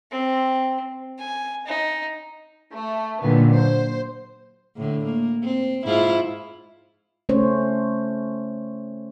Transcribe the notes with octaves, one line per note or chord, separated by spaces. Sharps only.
C4
G#5
D#4
A3
A#2 D3 D#3 F#3 B3
C5
A2 D3
A#3
C4
G#2 E4 F4
A3 C#4 C5 C#5